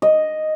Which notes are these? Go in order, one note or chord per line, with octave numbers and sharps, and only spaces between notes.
D#5